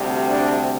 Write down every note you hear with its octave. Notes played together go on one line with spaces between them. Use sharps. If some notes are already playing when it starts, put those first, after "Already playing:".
Already playing: D2 C3 G3
D4